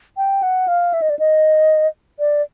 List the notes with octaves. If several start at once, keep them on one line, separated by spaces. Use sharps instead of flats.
G5
F#5
F5
E5
D#5
D5
D#5
D5